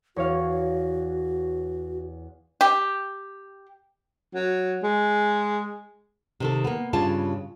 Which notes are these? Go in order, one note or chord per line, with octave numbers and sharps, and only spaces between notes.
E2 F#4 C#5 F5
G4
F#3
G#3
C3 D#3 A4
A#3 B3
G2 C#3 F4 A5